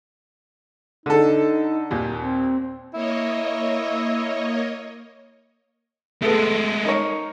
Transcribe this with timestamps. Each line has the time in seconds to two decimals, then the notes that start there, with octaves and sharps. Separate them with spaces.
1.06 D3 D#4 A4
1.91 D#2 A#2
2.22 C4
2.94 A#3 E4 C#5 D#5
6.22 G#3 A3 B3 A4
6.85 D#4 A#4 C#5